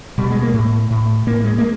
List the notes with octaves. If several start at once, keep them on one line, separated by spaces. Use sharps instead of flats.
B2 G3
G#3
A#3
A2
A2
A2 A#3
G#3
A#3